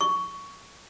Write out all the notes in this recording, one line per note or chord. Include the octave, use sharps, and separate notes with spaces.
C#6